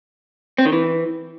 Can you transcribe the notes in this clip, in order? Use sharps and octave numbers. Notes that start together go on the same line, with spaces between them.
C4
D#3
E3